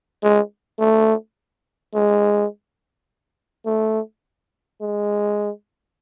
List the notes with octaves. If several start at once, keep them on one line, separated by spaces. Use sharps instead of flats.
G#3
A3
G#3
A3
G#3